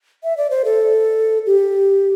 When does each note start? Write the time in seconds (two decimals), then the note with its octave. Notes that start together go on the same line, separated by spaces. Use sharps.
0.24 E5
0.37 D5
0.50 C5
0.65 A4
1.46 G4